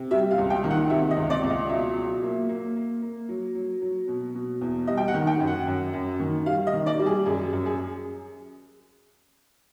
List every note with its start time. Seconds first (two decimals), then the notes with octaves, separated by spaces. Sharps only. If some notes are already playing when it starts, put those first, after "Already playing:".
Already playing: C3
0.11 G3 E5
0.31 F5
0.38 C#2
0.50 G5
0.64 D#3
0.70 F#5
0.90 C3 E5
1.11 D#5
1.17 C#2
1.30 D5
1.43 C#2
1.50 D#5
1.69 B2 E5
1.96 F#3
2.23 A#3
2.49 A#3
2.76 A#3
3.02 A#3
3.29 F#3
3.55 F#3
3.82 F#3
4.08 B2
4.35 B2
4.61 E2
4.87 G3 D#5
4.97 G5
5.08 F#5
5.14 D#3
5.27 G5
5.40 F#2
5.47 F#5
5.67 F#2
5.93 F#2
6.20 D#3
6.46 G3 F5
6.67 D#5
6.73 D#3
6.86 D5
6.99 G3
7.06 G#4
7.26 F#2 G#4
7.53 F#2
7.66 G#4